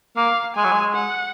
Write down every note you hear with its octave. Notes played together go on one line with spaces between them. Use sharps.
A#3 F5
G#3 G#5
F#3
G#3
F#5